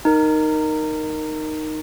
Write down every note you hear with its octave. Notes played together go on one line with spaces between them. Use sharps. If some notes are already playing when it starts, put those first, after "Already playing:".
D#4 A#4